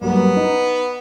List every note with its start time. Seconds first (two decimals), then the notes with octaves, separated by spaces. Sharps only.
0.01 G2 F#3 A#3 B3
0.37 D#4